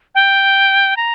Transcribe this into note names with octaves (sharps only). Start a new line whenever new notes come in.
G5
A#5